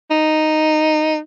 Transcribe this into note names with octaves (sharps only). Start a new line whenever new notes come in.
D#4